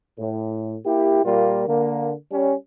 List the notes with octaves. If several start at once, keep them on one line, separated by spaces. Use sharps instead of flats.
A2
A#3 E4 G4
A#2 G3 A#3 F4
D3 A#3
G3 C#4